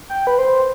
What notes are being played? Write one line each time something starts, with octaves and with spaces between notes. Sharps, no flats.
G5
B4
C5